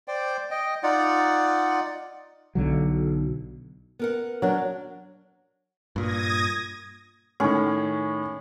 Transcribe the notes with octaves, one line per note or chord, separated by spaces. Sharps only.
C5 D5 G5
D#5 G5
D#4 F4 D5 F#5
B1 D3 F#3
B3 A#4 F#5
F#3 D4 A#4
G2 A#2 D#6 G#6 A#6
A2 D#3 C#4